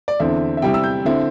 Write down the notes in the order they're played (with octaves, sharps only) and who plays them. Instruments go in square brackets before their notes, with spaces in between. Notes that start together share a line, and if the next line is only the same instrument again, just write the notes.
[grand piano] D5
E2 D3 C4 E4 E5
E5
C3 G3 E4 G5
E6
G6
D3 C4 E4